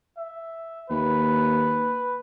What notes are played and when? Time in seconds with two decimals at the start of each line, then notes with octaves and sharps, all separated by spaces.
0.18 E5
0.90 D#2 B4